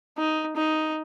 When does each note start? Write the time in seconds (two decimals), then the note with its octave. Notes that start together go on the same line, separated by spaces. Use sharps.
0.18 D#4
0.56 D#4